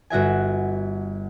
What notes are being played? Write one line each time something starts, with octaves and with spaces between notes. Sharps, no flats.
G1 F#4 E5 G#5